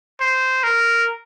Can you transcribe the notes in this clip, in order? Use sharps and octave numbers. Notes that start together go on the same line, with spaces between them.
C5
A#4